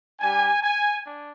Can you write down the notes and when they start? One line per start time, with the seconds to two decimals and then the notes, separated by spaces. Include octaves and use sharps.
0.20 G3 D4 G4 G#5
0.62 G#5
1.04 D4